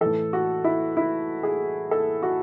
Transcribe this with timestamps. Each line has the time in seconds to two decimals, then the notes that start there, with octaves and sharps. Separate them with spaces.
0.01 A2 E3 A4
0.33 F#4
0.64 E4
0.97 E4
1.43 G#4
1.91 A4
2.23 F#4